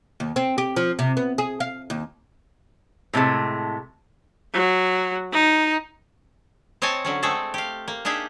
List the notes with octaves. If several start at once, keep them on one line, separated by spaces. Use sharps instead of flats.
D#2
C4
G4
F3
C3
B3
G#4
F5
D#2
A2 C3 G#3 A3
F#3
D#4
C4 C#5 D#5 G#5 A5
D3 F#3 C#4
G#3 A3 C4 G#4 A4
G4 F5
A#3
D4 D#4 G4 G#4 E5